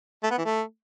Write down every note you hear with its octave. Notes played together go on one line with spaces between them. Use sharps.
A3
B3
E3
A3